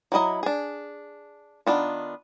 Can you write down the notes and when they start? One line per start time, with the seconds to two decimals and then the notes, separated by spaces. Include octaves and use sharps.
0.12 F#3 C4 E4 D#5 A#5
0.43 D4 G#4
1.66 D#3 A3 B3 D4 F4